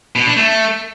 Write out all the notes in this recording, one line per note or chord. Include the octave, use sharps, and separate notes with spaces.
B2
D4
A3